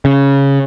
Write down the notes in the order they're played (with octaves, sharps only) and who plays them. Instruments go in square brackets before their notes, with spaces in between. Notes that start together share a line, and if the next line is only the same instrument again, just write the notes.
[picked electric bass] C#3